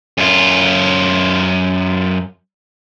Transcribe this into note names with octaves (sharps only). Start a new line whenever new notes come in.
F#2 F4